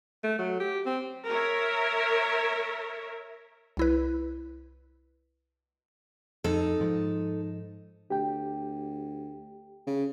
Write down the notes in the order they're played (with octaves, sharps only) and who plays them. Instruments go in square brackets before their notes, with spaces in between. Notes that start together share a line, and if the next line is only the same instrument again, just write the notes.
[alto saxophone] A3
F#3
G4
C4
[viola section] A#4 C#5 E5
[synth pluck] C2 E4 B4
[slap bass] F2 [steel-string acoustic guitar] D#4 A4
[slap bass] G#2 F3
[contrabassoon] D2 [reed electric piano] G4 G5
[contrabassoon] C#3